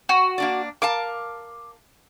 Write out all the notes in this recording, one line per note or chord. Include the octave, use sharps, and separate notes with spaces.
F#4
A#3 D4 D5
A#4 F5 A5 D6